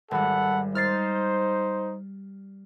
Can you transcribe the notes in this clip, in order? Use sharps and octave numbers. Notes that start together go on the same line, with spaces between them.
G#1 G3 A4 F#5 B5
D#4 C5 F6 A6 C7